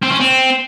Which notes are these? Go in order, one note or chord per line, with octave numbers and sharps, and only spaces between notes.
C4
C#4
C4